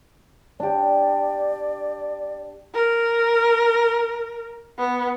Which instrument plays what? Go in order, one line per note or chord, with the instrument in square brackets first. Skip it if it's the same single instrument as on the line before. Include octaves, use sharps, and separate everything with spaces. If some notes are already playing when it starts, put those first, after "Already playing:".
[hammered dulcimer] D4 G4 [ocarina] D5
[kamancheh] A#4
B3